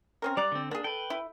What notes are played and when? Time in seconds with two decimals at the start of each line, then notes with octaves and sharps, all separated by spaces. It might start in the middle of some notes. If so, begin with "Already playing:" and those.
0.22 C4 C#4 A#4
0.37 G3 D5 A#5 F#6
0.52 D3 C4
0.71 A#3 D4 G#4
0.84 A4 B4 G5
1.10 E4